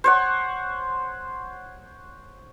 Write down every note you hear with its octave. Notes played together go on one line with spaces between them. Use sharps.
C5 C#5 F#5